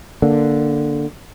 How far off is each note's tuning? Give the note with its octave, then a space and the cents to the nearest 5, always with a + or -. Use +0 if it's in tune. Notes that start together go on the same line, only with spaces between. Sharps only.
D3 +0 A#3 +0